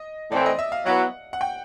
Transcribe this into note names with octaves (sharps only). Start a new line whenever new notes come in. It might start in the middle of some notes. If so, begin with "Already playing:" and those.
Already playing: D#5
A2 E3 A3 C4 D5
D#5
E5
F5
F#3 B3 E4 F#5
F#5
G5